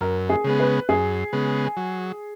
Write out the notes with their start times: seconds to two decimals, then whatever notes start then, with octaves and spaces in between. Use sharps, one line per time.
0.01 F#2 A#4
0.30 G#4
0.44 C#3 G#3 B3
0.60 B4
0.89 F#2 G#4
1.33 C#3 G#3 B3
1.77 F#3